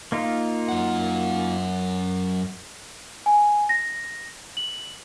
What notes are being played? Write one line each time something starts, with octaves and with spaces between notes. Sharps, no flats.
A#3 D#4 F4
F#2 F#5
G#5
A#6
F#7